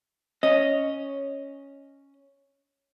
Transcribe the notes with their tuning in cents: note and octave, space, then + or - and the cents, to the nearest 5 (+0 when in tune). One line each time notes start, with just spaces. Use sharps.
C#4 +0 D#5 +0